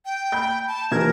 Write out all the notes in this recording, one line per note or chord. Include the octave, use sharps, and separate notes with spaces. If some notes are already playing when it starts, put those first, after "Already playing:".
G5
B5 G6
A5
D#1 E3 A#4 G#6